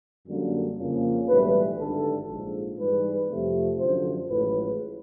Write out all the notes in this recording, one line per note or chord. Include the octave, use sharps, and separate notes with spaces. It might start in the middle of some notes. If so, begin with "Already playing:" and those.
F#2 D3 G3 A#3
F2 C#3 F3 A#3
B1 A2 E3 G3 B4
G#1 G2 D3 A4
A#1 G#2 F3
G#2 E3 G3 B4
F2 C3 F3 A3 C4
F#2 D3 F3 C5
A1 A2 F3 G#3 B4